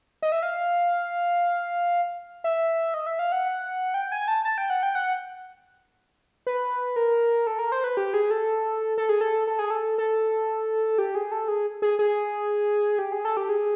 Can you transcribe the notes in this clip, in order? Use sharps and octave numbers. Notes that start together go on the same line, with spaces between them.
D#5
E5
F5
E5
D#5
E5
F5
F#5
G5
G#5
A5
A5
G5
F#5
G5
F#5
B4
A#4
A4
A#4
C5
B4
G4
G#4
A4
A4
G#4
A4
A4
G#4
A4
A4
G4
G#4
A4
G#4
G#4
G#4
G4
G#4
A4
G4
G#4